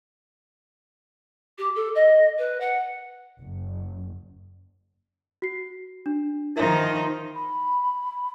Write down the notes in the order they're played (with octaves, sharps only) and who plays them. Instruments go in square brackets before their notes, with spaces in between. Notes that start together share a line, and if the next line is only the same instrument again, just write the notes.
[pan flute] G4
A4
D#5
B4
F#5
[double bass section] F#1
[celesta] F#4 C7
D4
[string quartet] D#3 F3 D#4 [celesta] E4 A#4 E5
[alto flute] B5